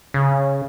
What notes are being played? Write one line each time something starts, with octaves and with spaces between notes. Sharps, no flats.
C#3